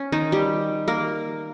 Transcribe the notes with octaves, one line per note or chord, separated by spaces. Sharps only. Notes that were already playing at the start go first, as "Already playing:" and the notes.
Already playing: C#4
D#3 D#4
G3 G4
A#3 A#4